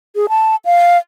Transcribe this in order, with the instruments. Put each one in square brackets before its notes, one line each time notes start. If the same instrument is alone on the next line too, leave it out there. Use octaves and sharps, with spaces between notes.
[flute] G#4
A5
F5